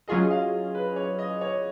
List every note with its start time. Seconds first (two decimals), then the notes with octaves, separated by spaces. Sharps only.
0.08 F#3 C#4 F4 G#4 D#5
0.31 F5
0.75 B4
0.96 C#5
1.19 D#5
1.41 C#5